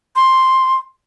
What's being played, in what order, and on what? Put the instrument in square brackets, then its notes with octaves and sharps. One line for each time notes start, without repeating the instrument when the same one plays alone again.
[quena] C6